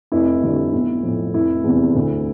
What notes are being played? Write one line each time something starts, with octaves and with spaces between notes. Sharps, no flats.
F1 E4
F2 D3 G3
B1
A2 F3 A3
F1 E4
E2 C3
D2